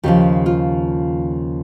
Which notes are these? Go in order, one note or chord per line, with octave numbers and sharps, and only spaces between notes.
D#2 C#3 F3 G4
F4